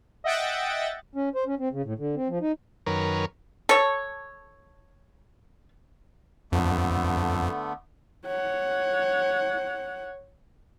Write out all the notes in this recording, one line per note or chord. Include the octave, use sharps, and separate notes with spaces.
D#5 E5 F#5 G5 A6
C#4
C5
C#4
C4
C#3
A2
D3
C4
F3
D#4
F#2 D#3 A#4 B4 C#5
A4 C#5
F2 D3 A3 B3
C#5 F#5